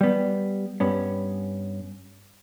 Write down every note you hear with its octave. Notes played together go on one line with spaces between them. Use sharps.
G3 B3
G2 B3 C#4